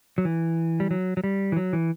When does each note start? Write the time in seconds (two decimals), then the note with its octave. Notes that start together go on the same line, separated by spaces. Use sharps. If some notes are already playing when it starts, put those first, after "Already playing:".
0.18 F#3
0.25 E3
0.80 G3
0.91 F#3
1.17 F#3
1.24 G3
1.52 E3
1.57 F#3
1.73 E3